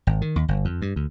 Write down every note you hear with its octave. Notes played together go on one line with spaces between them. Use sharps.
G#1
D#3
D#2
G1
F2
G2
D2